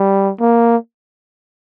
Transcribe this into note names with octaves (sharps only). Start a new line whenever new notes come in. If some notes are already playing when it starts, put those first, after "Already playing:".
Already playing: G3
A#3